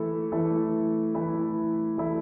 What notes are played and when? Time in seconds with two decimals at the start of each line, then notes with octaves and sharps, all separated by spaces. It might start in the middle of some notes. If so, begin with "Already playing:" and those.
Already playing: E3 A3 E4 A4
0.32 E3 A3 E4 A4
1.15 E3 A3 E4 A4
1.98 E3 A3 E4 A4